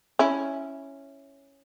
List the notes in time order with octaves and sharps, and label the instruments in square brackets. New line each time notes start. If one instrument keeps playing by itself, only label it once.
[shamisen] C#4 E4